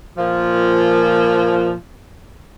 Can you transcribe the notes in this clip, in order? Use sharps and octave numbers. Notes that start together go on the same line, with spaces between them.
A#2 F3